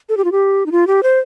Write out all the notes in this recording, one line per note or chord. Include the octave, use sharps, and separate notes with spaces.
A4
G4
F4
G4
D#4
F4
G4
C5